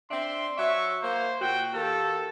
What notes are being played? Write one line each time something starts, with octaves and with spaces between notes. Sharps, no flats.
C4 D4 E5 C6
F#3 E5 C#6
A#3 C5
A#2 F#4 G5
D#3 A#3 G4 A4